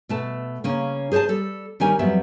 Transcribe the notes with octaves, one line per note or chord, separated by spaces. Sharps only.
B2 A3 A5
C#3 A#3 C#4
G#4 C5 C#5 D#5 A5
G3 A4
D#3 G3 C#4 A#4 G#5
F2 F#3 G3 B3 E5